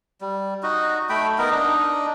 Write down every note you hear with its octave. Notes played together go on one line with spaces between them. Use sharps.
G3
D#4 F#4
A3 G5 B5
B3 D#4 A#4
D4 D#4